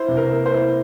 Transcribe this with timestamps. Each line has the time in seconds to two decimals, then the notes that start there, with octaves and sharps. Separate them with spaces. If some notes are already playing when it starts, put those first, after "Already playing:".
Already playing: E4 C5
0.08 C3
0.17 A#4
0.31 A#3
0.46 C5
0.54 E4